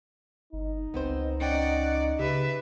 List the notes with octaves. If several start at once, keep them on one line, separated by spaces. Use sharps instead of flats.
G1 D#4
C#2 B3 C4 C5
C#4 D5 D#5 F#5 G5
C#3 G4 B4 E5